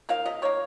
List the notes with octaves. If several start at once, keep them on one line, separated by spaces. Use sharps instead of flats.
D#3 A#3 F5
C3 D#5
D#3 A#3 C#5